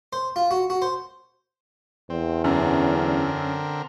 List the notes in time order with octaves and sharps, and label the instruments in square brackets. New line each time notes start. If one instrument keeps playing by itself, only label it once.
[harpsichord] C5
F4
F#4
F#4
C5
[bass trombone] E2 [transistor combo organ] C4
[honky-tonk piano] F#2 [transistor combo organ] D3 C4 A#4